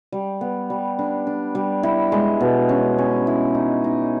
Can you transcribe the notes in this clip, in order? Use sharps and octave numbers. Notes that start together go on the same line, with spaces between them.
G3
B3
G3
D4
D4
G3
E4
G#3
B2
C#4
C#4
E4
D#4
D#4